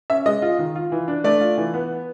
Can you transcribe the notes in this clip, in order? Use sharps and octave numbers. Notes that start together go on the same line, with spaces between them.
C#4 E5
G#3 D#5
F4
D#3
F4
E3
D4
A3 D5
F4
E3
B3